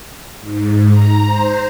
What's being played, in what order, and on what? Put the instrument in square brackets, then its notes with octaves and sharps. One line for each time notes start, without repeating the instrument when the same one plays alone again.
[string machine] G#2
A#5
C5